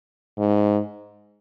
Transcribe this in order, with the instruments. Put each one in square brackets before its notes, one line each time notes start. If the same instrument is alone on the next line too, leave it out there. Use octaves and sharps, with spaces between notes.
[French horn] G#2